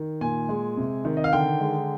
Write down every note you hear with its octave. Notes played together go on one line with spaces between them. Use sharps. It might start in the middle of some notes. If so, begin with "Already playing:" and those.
Already playing: D#3
A#2 G#5
G#3
C3
D#3
D#5
F5
D3 G5
G#3